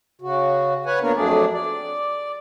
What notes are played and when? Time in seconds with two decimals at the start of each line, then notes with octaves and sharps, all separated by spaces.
0.21 C#3 F#4
0.86 B4 C#5 F#5 G#5
1.01 D2 A#3 B3 D4 A#4 C#5
1.15 F2 F#3 A3 D4 G#4 D5
1.52 D5